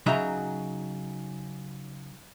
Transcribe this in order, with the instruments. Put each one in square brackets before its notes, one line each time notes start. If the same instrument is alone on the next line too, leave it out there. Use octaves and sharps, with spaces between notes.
[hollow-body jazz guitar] C#3 F#3 D#4 E5 A#5